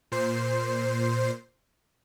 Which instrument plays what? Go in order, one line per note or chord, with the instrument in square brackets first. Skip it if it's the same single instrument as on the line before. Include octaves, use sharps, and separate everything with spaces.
[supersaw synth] A#2 C5 C7